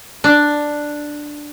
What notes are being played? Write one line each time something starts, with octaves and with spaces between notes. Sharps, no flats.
D4